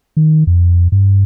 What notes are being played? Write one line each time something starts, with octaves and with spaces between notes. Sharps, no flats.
D#3
F2
G2